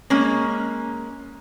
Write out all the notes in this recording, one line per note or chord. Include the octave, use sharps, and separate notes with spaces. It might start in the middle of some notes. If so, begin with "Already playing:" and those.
G#3 A#3 C#4